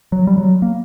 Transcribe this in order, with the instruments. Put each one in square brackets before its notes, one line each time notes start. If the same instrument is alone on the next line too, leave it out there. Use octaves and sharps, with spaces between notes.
[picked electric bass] F#3
G3
F#3
A#3